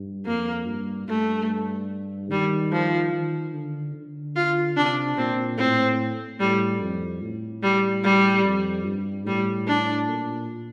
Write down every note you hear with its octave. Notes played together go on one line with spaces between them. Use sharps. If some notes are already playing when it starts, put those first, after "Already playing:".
Already playing: G2
F2 A#3
G2
G2 A3
D#3 G3
F3
D#3
D3
D3
F4
C3 D4
A#2 C4
A2 C4
A2 G3
F2
A2
G3
G3
F2
G2
A2 G3
D4
A#2